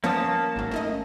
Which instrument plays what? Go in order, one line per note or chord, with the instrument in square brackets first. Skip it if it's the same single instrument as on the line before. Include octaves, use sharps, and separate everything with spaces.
[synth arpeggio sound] F3 B3 C#5 [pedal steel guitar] A#3 C#4 D#6 [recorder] A5
[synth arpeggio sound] G#1 F#3
A3 D#4 D#5